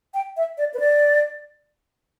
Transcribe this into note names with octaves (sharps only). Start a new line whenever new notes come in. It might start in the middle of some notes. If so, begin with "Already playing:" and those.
G5
E5
D5
B4
D5